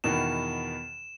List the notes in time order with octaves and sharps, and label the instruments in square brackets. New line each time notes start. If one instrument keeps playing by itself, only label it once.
[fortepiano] E2 B2 D#3 [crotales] E7